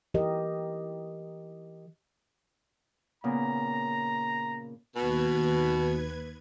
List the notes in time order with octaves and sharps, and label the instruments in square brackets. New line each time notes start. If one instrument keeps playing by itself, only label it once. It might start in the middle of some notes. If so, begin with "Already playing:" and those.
[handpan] E3 G4 A#4 D#5
[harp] A#2 C#3 B3 [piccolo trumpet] A#5
[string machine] D#2 B4 G#6 [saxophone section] B2